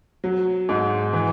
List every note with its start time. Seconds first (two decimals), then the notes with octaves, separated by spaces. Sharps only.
0.24 F#3
0.69 G#2
1.13 E3